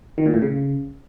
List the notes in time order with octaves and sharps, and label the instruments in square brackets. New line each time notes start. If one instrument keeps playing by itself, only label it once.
[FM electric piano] D#3
A#2
A2
C#3